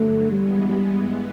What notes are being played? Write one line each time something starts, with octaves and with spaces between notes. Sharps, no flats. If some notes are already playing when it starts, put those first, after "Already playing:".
Already playing: G2 D3 F#3 A3
G2 E3 G3 G#3 B3
G3